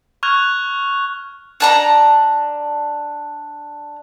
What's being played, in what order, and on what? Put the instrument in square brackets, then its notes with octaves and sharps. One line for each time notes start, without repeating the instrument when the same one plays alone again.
[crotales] C#6 F6 F#6 G#6 F7
[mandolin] D4 A5 A#5